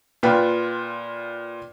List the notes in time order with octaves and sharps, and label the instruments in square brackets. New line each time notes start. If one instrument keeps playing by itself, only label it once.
[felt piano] A#2 F4 B4 G5